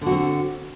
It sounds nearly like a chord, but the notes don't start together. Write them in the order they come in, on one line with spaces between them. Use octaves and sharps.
D3 F#4 C4